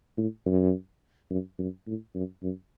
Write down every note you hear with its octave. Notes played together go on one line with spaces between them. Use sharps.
A2
F#2
F#2
F#2
A2
F#2
F#2